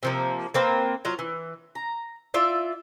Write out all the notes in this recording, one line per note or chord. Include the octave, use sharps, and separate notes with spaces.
C3 F3 A#3
A#3 C4 A#4 B4
F#3 F4
E3
A#5
E4 F4 D5 E5